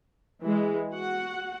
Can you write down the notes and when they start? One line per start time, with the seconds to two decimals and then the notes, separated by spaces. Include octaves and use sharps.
0.42 E3 G#3
0.92 F#4 F#5